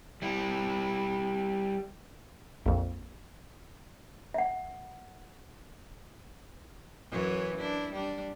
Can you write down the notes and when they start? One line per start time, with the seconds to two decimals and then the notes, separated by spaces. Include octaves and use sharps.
0.22 G3 E4
2.66 A#1 F2
4.34 E5 F#5
7.10 F#2 E3 C#5
7.58 D4 E4
7.93 G3 D4